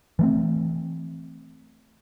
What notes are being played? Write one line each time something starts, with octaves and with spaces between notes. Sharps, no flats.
E3 A3 C4